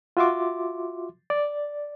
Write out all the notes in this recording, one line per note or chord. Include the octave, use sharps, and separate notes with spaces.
F4 F#4 E5 C6 D6
D5